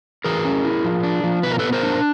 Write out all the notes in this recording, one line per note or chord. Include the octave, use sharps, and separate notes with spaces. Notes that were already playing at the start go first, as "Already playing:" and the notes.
E3 G#4 A#4
C#4
E4
F3
D4
F3
B2 B4
A#4
B3 A4 B4
A#4 C5
D4